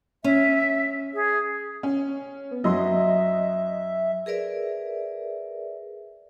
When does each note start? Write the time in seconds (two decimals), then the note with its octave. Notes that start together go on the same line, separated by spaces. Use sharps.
0.24 C#4 E5
1.14 G#4
1.83 C#4
2.51 B3
2.64 F#2 F#3 D#5 E5 C6
4.26 G#4 A#4 B4 D5 E5